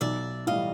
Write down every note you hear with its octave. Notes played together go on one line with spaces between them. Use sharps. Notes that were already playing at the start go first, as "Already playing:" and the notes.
B1 D5 E5
A2 E3 G3 D#5 F5